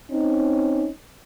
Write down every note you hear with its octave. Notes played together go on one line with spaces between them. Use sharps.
C4 C#4 D#4